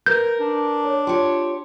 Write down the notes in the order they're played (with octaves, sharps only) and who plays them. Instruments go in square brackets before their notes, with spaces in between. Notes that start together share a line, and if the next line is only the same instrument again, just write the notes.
[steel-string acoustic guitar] A#4 [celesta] B4 [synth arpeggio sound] G6
[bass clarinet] D4
[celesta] C#5 A5
[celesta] F4 G5 C6 [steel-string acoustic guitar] G4 C#5